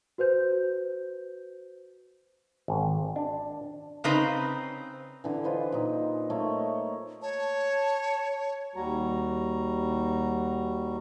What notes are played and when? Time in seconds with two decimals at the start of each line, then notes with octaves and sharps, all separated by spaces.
0.18 F#4 B4 C5 G6
2.68 G#1
3.16 D4
4.04 C#3 C4 D#4 B4 A#5
5.24 D3 E3
5.44 F4 B4 C5 D#5
5.72 A#2 D#4
6.30 A3 A#3 D#4 C#5
7.22 C#5 A5
8.75 D#2 G3 F#4 A#5